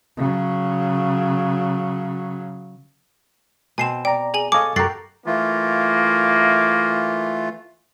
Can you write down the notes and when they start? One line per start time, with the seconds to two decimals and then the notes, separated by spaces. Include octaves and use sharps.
0.17 C#3 F#3
3.78 B2 C4 G#5 C7 E7
4.05 D5 G5 A#5
4.34 G#4 G#5 F#7
4.52 A4 C#5 D#5 F5 G#5 D6
4.76 F#2 F#4 G4 A4 A#4 A6 C7
5.26 E3 A3 A#3 F4